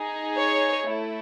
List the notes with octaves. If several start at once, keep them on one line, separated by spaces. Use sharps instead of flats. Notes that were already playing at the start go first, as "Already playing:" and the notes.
Already playing: D#4 G#4
C#5
A3 E4